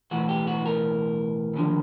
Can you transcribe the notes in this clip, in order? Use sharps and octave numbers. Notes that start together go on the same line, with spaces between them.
B1 A2 E3 F#4
G4
F#4
A#4
D#2 D3 F3